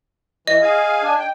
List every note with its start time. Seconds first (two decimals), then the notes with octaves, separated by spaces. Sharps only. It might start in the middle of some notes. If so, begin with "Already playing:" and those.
0.47 E3 D#5
0.62 G#4 F5 G#5
1.03 D4 G#5
1.18 G5